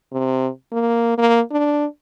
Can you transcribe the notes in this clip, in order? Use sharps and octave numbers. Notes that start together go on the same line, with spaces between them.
C3
A#3
A#3
D4